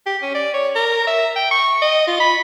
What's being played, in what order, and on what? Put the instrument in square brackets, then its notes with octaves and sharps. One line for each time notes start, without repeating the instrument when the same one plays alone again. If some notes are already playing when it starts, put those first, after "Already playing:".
[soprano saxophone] G4
C#4
D5
C#5
A#4
E5
G5
C#6
D#5
F4
B5